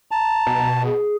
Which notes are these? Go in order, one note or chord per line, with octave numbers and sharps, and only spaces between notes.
A5 A#5
B2
G#4